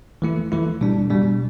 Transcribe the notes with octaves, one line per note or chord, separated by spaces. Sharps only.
E3 A3 E4
E3 A3 E4
B2 G3 D4
B2 G3 D4